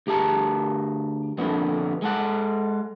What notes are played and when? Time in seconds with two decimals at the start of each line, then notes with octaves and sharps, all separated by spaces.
0.07 D2 G4 G#4 A5 A#5
1.38 F2 A#2 D3 B3
2.02 G#3 A4 F#5